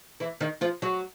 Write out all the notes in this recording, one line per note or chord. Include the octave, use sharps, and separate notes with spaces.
E3 E4
D#3 D#4
F3 F4
F#3 F#4